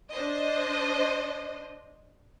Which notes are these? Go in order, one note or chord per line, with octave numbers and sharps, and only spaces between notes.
D4 C5 D#5